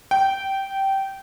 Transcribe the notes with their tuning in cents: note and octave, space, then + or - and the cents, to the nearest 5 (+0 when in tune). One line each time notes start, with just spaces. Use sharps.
G5 -15